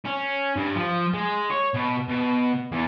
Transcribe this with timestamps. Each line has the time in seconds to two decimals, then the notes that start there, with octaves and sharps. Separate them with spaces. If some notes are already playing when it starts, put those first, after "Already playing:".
0.05 C#4
0.56 G2
0.76 F3
1.14 G#3
1.50 C#5
1.75 B2
2.09 B2
2.72 E2